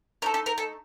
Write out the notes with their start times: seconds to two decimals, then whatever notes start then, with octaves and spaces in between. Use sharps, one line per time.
0.22 A3 D#4 A4 A#4
0.34 A4
0.46 A#4
0.58 A4